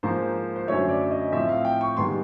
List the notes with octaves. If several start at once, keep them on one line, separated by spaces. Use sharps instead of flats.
G#2 F3 A#3 C5
C5
F#2 D3 F#3 A3 C#5
D5
D#5
A2 F3 A3 C4 E5
F5
G5
C#6
G#2 D#3 G3 B3 C6